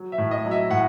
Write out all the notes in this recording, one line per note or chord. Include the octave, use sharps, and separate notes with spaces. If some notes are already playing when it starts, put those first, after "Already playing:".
Already playing: F#3
E5
A2
D#5
F#3
E5
A2 F#5